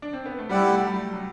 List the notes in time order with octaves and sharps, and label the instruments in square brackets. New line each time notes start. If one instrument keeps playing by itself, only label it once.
[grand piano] D4
C4
B3
A3
[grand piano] G3 [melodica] E4 G4 D5 F#5
[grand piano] A3
F#3
F#3